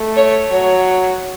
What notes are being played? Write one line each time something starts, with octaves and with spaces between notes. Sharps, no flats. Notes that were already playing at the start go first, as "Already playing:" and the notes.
Already playing: A3
C#5
F#3 C#5